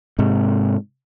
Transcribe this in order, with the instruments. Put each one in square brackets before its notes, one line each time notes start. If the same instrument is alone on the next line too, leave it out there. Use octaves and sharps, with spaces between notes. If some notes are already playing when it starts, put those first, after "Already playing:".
[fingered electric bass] G#2 C3